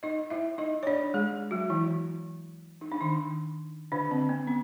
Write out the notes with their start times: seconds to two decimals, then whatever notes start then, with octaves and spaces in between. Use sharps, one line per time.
0.03 D#4 D#5
0.30 E4 E5
0.58 D#4 D#5
0.83 C#5
0.87 D4 D5
1.14 G#3 G#4
1.51 F#3 F#4
1.70 E3 E4
2.81 D#4
2.92 D4
3.01 D#3 D#4
3.92 D3 D4
4.11 C4
4.29 B3
4.47 C#4